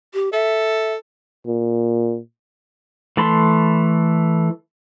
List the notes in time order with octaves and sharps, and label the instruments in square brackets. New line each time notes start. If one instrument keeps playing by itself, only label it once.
[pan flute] G4
[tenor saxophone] A4 [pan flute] E5
[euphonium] A#2
[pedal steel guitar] E3 A3 A5 B5 C6